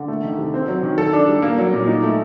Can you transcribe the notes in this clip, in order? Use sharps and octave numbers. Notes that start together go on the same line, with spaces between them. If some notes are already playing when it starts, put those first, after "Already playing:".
Already playing: D3
A3
D#3
C3
C4
F#3
D#3
A4
D4
G3
A#3
F#3
A#2
D#4
A3